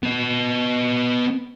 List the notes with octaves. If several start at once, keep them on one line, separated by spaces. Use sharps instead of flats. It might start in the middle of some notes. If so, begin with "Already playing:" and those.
B3 D#5